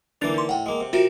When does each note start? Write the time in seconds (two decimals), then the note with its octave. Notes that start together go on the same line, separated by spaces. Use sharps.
0.21 D3 E3 A#3 D4 A6 F7
0.34 D#4 C6
0.49 A2 F#5 G5
0.66 G#3 A#3
0.80 C3
0.93 C3 F4 F#4 A#4 E5